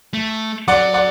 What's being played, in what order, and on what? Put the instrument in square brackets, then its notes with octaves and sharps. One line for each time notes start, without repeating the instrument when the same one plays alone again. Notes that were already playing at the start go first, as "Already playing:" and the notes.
[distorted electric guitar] A3
[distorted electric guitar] F#3 [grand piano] D5 F#5
[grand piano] D5 F#5